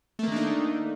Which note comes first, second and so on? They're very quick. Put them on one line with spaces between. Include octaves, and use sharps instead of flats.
A3 A#3 D#3 D4 D#4